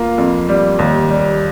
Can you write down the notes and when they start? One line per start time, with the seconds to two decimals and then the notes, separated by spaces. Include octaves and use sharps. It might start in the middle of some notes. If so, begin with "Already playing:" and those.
Already playing: A#3 F4
0.18 F2
0.49 G3
0.79 D#2
1.10 G3